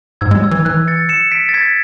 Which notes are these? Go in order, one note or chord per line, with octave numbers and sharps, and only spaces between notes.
G#2 E6 G#6
G#3
F#3
E6 G#6
E3
E3 F#6
A6 C#7
C#7 E7
B6 D7
A6
G#6 B6